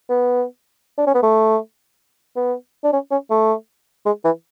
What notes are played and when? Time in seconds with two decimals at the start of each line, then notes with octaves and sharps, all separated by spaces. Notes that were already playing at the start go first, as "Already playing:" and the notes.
0.10 B3
0.98 D4
1.07 C#4
1.15 B3
1.23 A3
2.36 B3
2.84 D4
2.93 C#4
3.11 C#4
3.31 A3
4.06 G#3
4.25 E3